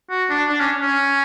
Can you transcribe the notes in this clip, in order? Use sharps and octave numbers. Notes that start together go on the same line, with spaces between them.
F#4
D4
D4
C#4
C#4